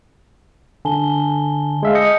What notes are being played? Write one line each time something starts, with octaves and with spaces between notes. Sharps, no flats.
D3 G#5 A5 G7
G#3 E5 F5
D#5 G6 C#7